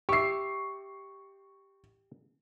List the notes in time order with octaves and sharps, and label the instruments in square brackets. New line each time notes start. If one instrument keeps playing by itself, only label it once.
[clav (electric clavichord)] G4 E5 [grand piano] C#6 C7